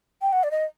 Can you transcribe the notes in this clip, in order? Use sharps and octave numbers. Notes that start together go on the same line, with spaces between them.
G5
F#5
D5
D#5